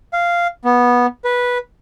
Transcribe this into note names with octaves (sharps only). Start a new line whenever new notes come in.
F5
B3
B4